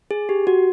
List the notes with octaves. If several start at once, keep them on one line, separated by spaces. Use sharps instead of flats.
G#4
G4
F#4